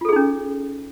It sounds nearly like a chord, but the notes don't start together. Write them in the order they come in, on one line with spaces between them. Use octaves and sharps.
F4 A4 G#4 D#4 C#4